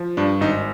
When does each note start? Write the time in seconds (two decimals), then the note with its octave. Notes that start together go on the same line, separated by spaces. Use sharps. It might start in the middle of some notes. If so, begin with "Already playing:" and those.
Already playing: F3
0.17 G2 D4
0.41 G#1 D#4